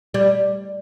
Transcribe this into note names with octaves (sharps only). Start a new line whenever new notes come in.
G3